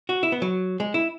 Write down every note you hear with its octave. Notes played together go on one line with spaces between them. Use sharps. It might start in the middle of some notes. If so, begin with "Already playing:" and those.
F#4
E4
B3
F#3
G#3
E4